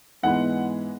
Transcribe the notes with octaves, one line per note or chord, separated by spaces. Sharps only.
G#2 E3 G#3 B3 F#5